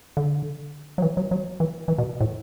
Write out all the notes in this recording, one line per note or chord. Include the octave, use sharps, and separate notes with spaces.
D3
F#3
E3
F#3
F#3
E3
E3
B2
A2